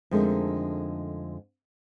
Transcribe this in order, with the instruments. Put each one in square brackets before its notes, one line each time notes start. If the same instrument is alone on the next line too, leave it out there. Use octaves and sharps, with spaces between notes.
[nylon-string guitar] F2 D3 G#3 A3 D#4 A#4